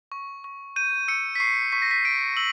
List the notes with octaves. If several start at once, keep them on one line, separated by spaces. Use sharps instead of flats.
C#6
C#6
G6 D#7
E6 C#7
B6
C#6 C7
C#6 B6
A#6
B6
G6 D7
E6 F#7